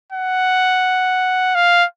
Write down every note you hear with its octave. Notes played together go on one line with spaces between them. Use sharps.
F#5
F5